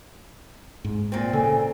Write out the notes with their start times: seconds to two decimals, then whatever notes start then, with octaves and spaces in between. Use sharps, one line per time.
0.85 G#2
1.12 A#2 D3 C4
1.33 C#3 A4 G#5